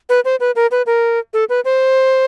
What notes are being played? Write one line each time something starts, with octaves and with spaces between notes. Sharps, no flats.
B4
C5
B4
A#4
B4
A#4
A4
B4
C5